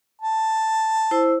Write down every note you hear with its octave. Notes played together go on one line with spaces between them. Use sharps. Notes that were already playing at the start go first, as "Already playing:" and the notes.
A5
E4 C5 E6